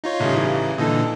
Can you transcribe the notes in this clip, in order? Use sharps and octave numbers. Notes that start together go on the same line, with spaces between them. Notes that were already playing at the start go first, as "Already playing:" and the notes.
D#4 F4 C#5
A1 C#3 G3
E3
A#2 D3 E3 D#4 A4